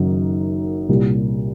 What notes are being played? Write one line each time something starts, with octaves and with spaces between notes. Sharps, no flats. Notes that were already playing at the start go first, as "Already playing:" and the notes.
Already playing: F#1 F#2 D#3 F#3
C2 A#2 G3